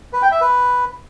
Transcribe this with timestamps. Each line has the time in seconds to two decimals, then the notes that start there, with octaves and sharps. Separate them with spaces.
0.13 B4
0.22 G5
0.32 E5
0.41 B4